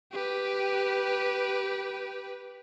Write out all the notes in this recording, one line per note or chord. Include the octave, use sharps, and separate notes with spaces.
G4 B4